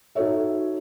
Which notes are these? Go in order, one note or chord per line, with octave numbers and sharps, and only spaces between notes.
D#4 F#4 A4 C#5 E5